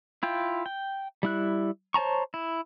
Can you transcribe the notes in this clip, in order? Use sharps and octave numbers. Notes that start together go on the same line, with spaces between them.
E4 F4 G5
G5
G3 E4 F#6
C5 C#5 A5 A#5 C#6
E4